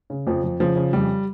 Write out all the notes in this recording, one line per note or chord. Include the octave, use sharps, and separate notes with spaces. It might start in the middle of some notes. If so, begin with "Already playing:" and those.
C#3
F2 F3
F2
C#3 F3
C#3
F2 G3